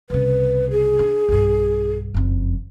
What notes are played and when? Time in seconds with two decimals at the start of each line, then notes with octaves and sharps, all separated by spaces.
0.10 C2 C#3 B4
0.71 G#4
0.99 D4
1.29 B1 G2
2.14 F#1 F2